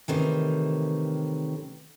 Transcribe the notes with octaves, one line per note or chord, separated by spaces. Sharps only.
A2 C3 D#3 E3